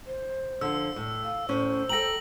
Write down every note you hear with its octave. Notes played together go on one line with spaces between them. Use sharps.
C5
D3 F3 E6
A2
F5
A2 C#4 C5
A4 G5 A#5 A#6 F#7